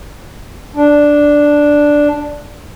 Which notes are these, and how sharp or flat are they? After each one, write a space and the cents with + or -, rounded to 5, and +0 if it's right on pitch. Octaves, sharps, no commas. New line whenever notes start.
D4 +0